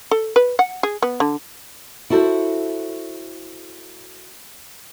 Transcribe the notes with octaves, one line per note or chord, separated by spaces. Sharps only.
A4
B4
F#5
G#4
B3
D3
E4 F#4 A4 B4 C5